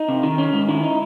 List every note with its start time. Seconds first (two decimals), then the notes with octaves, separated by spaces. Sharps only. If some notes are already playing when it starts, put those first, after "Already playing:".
Already playing: D#4
0.08 C3
0.23 D#3
0.38 C#4
0.53 G#2
0.68 D#3 E4
0.83 D#4